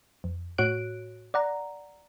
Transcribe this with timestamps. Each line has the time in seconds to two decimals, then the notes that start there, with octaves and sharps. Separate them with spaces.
0.24 F2
0.58 A2 F#4 C#5 F#6 D7
1.34 D5 F#5 A#5